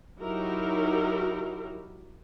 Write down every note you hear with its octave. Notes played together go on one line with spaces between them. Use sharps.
F#3 D#4 E4 F#4 G4 A#4